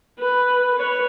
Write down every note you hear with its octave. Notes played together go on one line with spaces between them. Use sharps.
B4
B4 C#5